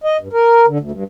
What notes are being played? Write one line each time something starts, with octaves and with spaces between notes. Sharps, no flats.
D#5
G2
A#4
D3
D2
G2